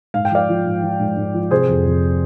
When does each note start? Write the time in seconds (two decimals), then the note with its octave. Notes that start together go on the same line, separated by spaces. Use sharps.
0.14 G#2 F5
0.25 G5
0.31 F3 D5 F5
0.49 F3
0.65 G#2
0.83 F3
1.00 G#2
1.17 G#2
1.34 F3
1.51 C3 G#4 C5
1.69 F2
1.86 F2